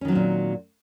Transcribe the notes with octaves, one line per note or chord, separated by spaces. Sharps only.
A#2 D#3 F#3 C4 C#4